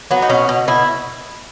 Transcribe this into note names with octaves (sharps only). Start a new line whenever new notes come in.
F#3 B3
D#4
B2 C#4
B2
B2 E4